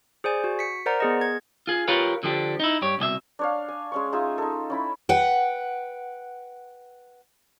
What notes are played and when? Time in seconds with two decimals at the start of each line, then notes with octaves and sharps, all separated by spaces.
0.24 G#4 C5 D5 G#5
0.44 F#4
0.59 B6 C#7
0.86 A#4 C5 D5 F#5 A#5
1.00 B3 G#4 D#5
1.21 G#6
1.67 F4 G#4
1.88 F4 G4 A#4 B4 C#5 F5
2.23 D3 F3 D4 G4
2.60 D#4 E4
2.82 G2 G4 C#5
2.99 C2 B2 G4 E5
3.39 D4 C#5 F5
3.68 G#5
3.92 G#3 C#4 C#6
4.13 D#4 F4 G#4 E5
4.38 D#4 A4
4.70 C#4 E4 B5
5.09 B4 F#5 G5